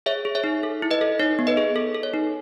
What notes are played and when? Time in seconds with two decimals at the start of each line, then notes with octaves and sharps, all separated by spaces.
0.06 G#4 C#5 E5
0.25 G#4
0.35 C#5 E5
0.44 D#4
0.63 A4
0.82 E4
0.91 B4 D#5
1.01 A4
1.19 D#4 C#5
1.39 B3
1.47 B4 D#5
1.57 G#4
1.76 A4
1.95 A4
2.03 C#5
2.14 D#4